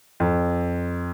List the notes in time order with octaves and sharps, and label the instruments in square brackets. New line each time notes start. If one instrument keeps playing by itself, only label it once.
[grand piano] F2